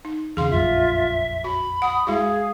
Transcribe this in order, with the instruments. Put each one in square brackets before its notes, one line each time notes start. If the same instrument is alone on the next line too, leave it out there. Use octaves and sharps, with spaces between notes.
[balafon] D#4
[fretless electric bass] E2 C#3 [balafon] G#4 C6 [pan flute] F5
[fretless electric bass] F1 A#1 F#2 [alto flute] F4 [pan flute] E5
[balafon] F#4 [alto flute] B5
[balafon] F#5 [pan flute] D#6
[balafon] G#3 E4 F#4 [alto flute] G#4 [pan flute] F5